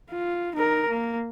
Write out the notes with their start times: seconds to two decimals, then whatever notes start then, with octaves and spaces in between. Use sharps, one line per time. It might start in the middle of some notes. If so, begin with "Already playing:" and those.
0.11 F4
0.55 D#4 A#4
0.88 A#3